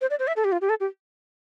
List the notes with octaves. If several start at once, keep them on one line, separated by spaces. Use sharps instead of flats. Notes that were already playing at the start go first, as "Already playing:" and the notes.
C5
D5
C5
E5
A4
G4
F4
G4
A4
G4